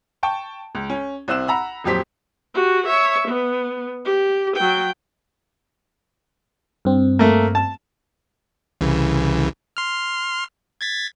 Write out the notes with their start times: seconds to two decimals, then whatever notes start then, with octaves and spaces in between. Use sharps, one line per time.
0.23 G5 A5 C#6
0.75 C#2
0.90 C#4
1.28 C2 C4 E6 F#6 E7
1.47 F#5 A#5 B5 E6
1.84 D#1 F2 F#3 G4 C5 B6
2.54 F#4 G4
2.87 C#5 E5
3.28 B3
4.05 G4
4.56 F#3 G5
6.85 G2 C4
7.19 A3 A#3
7.55 A5
8.81 C2 C#3 E3
9.77 C6 F6
10.81 G#6 A6 B6